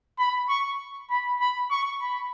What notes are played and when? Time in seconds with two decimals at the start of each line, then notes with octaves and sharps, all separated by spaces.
0.18 B5
0.49 C#6
1.10 B5
1.40 B5
1.70 C#6
2.01 B5